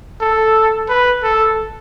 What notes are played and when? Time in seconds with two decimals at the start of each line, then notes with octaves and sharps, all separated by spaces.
0.21 A4
0.89 B4
1.23 A4